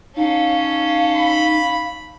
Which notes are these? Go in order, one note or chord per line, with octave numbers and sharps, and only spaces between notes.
C#4 D#4 A4 F5
B5